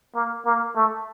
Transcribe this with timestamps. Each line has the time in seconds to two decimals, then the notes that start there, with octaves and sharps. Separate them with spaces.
0.15 A#3
0.45 A#3
0.76 A3